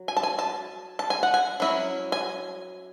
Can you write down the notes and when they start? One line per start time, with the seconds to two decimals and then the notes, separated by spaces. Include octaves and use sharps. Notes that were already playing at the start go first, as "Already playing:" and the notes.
Already playing: F#3
0.08 G#5
0.17 A5
0.23 G#5
0.39 A5
0.99 A5
1.10 G#5
1.23 F#5
1.34 G#5
1.60 F#3 C#4 E4
2.12 G#5